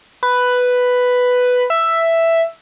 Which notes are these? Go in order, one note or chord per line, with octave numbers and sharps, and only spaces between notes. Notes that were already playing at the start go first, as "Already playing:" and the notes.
B4
E5